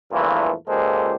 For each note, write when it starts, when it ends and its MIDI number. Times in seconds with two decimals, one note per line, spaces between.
0.12 0.52 40
0.12 0.52 43
0.12 0.52 46
0.12 0.52 52
0.12 0.52 53
0.12 0.52 57
0.68 1.16 37
0.68 1.16 46
0.68 1.16 56
0.68 1.16 67
0.68 1.16 69
0.68 1.16 72